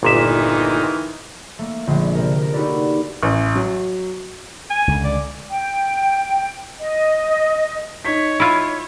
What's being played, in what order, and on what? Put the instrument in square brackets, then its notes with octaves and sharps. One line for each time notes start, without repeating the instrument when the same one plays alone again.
[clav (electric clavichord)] G1 A#2 E5 [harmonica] D#3 E3 D#4
[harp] A3 A#3
A#1 D3 G#3
C3 A#4
A#4
D#4 F#4 G4 A4 B4 D5
[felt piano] A1
F#3
[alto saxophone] G#5
[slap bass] C#2 D3
[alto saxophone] D5
[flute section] G5
D#5
[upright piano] D#4 B6 [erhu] C#5
[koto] E4 F4